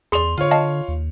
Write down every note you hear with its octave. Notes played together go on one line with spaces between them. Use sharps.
E2 G#4 D5 C6 F7
D3 F4 C#5
D#5 F5 A5
D#2